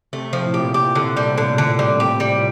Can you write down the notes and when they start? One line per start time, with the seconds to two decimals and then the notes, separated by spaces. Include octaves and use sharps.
0.13 C3 A3
0.33 F3
0.45 A2
0.54 A#2 G4
0.74 G4
0.95 A2 D3
1.17 G3
1.38 D3
1.58 D3
1.79 G3
2.00 G4
2.20 G3